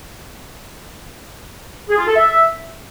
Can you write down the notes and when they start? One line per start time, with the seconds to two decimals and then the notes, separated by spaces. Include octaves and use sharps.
1.89 G#4
1.98 F4
2.07 A4
2.16 E5